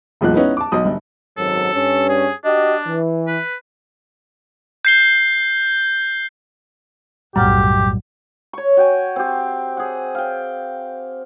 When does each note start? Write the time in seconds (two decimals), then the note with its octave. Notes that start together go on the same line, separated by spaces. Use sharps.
0.21 E1 B1 A#2 F#6
0.34 B3 C#4 D#4 E4 B4
0.57 A5 D6
0.72 B1 D#6
0.85 G1
1.37 G#1 F#2 F#3 A4
1.73 G2 C#4
2.09 G#4
2.44 D4 F#4 G4 D#5
2.86 E3
3.28 B4
4.85 G6 C7 G7
7.36 B1 F#2 A2 G3 G4 F#5 F6
8.53 C#5 C#6
8.77 F#4 G5 G#5
9.16 C4 G4
9.77 G#4 F#5
10.15 F5 G5